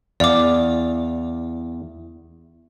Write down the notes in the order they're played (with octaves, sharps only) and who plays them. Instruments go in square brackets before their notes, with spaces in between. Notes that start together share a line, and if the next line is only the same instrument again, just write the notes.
[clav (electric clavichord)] E2 F5 [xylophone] D5 D6